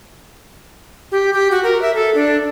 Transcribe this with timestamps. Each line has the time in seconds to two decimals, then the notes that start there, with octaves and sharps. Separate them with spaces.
1.12 G4
1.33 G4
1.51 F#4
1.64 A#4
1.82 E5
1.94 A4
2.15 D4